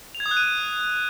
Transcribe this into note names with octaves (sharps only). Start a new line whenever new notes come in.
F7
G#6
D#6
F#6
D#7